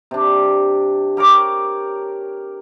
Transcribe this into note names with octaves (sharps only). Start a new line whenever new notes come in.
C3 D4
G4 A#4 C#5 D6